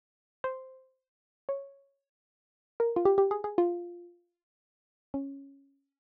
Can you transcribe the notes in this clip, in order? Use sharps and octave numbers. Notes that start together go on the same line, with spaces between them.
C5
C#5
A#4
F4
G4
G4
G#4
G#4
F4
C#4